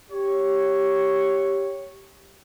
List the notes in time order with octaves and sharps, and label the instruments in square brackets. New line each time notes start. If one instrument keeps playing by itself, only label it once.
[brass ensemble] G4 C#5